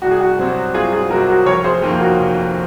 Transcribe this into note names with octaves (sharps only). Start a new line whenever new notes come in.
C2 F#4
G#4
F#4
C3 F#3 C4
C2 F4 G#4
F4 G#4
C3 F#3 C4 F#4 A#4
F#4 A#4
F1 A#4 C#5
G#4 C5
F2 D#3 A#3 F4
F#4 A#4
F1